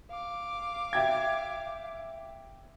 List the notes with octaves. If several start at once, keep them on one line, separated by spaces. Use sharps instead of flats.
F5 D6
E5 G5 G#6